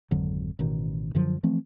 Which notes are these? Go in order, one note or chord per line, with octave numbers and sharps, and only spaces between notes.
G#1 F2 D3 F#3
A1 B2 D#3
F#2 D3 F3 F#3
E3 F3 A3 C4